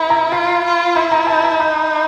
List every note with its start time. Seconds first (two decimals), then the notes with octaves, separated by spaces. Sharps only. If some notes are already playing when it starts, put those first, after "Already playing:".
Already playing: E4 B5
0.10 A#5
0.32 F4 B5
0.64 F4
0.95 E4 B5
1.12 A#5
1.27 A5
1.44 A#5
1.59 D#4 B5